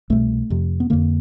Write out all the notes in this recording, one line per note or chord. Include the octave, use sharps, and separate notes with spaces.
C2 B2 A3
F2 C3
B3
F2 D3 A#3